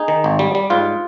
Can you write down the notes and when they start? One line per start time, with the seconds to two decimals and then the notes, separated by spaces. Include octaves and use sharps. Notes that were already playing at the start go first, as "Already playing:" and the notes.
Already playing: D#4 G#4
0.08 D#3
0.24 G#1
0.39 G3
0.55 G3
0.70 G#2 F4